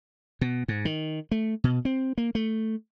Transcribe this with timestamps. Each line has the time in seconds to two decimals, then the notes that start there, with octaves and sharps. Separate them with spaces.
0.41 B2
0.68 G#2
0.85 D#3
1.31 A3
1.64 B2
1.85 C4
2.18 A#3
2.35 A3